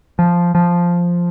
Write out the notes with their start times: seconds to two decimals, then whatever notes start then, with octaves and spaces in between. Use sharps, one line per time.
0.19 F3
0.55 F3